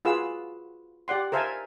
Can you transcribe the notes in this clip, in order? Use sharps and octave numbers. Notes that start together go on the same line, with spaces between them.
F4 F#4 G#4 B4 F5 E6
G4 D5 F#5 C6
A#4 C5 E5 F5 G#5 A5